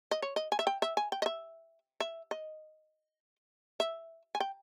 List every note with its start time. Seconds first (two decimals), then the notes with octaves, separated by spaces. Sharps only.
0.11 D#5
0.22 C#5
0.36 D#5
0.52 G#5
0.59 E5
0.67 G5
0.82 E5
0.97 G#5
1.12 G5
1.22 D#5
1.26 E5
2.00 E5
2.31 D#5
3.80 E5
4.35 G#5
4.40 G5